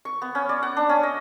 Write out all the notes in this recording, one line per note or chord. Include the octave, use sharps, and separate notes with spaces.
C#6
B3
C#4
D5
F#5
D4
C#4
D#5